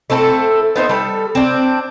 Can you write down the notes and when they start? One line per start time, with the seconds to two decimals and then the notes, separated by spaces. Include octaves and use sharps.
0.10 A3 C4 E4 A4
0.76 B3 D#4 C5 E5
0.89 G3 A4
1.35 C4 D4